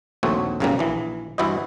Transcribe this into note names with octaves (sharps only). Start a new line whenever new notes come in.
A#1 D#2 A3 C4 F#4 C#5
B1 F#2 C#3 F3 G3 A#3
A#1 E3
G2 E3 E4 F#4 C5 D#5